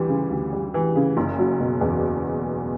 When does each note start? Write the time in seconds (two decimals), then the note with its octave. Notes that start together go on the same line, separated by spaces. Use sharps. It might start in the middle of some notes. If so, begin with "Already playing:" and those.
Already playing: D2 E3 G3
0.09 C#3
0.30 D2
0.53 G3
0.74 E3
0.95 C#3
1.17 F#1
1.39 F#3
1.60 B2
1.81 E2